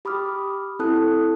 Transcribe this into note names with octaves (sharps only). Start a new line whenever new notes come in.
G4 B5 D6 D#6 F6
C4 E4 A4 A5 D#6 F#6